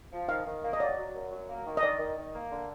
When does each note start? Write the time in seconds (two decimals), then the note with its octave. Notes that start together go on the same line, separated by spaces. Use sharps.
0.12 F3
0.28 D#3 F5
0.45 D#3
0.62 A#3
0.73 D#5
0.79 F#3 D5
0.97 F#3
1.14 F#2
1.31 F#3
1.49 A#3
1.65 D#3
1.77 D#5
1.82 D#3 D5
1.99 D#3
2.17 D#3
2.33 A#3
2.50 D3